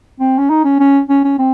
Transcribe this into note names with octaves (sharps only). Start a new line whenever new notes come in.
C4
C#4
D#4
C#4
C#4
C#4
C#4
C4